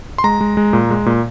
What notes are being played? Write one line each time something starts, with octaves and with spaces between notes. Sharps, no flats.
C6
G#3 A#5
G#3
G#3
A#2
G#3
A#2